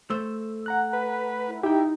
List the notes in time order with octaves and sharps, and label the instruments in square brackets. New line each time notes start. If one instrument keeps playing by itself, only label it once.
[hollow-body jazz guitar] A3 C5 [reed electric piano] E6
[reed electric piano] F#5 A#5 F#6
[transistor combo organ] B4
[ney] E4
[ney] D#4 [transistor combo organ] E4 [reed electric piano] G4 G5